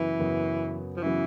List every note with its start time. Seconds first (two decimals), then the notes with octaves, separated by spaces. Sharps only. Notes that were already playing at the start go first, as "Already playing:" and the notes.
Already playing: F#2 C#3 E3 F#3 B3
0.19 F#2 C#3 F#3 B3
0.97 F3
1.03 C#3 E3 F#3 B3